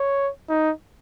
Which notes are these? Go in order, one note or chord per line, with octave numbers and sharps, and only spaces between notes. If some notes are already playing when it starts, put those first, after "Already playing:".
Already playing: C#5
D#4